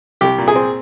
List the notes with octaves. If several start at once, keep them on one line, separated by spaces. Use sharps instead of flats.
C2 G4
A#2
G#4
C4